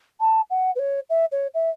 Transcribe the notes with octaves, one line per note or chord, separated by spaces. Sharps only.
A5
F#5
B4
C#5
E5
C#5
E5